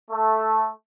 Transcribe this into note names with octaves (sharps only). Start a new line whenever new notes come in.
A3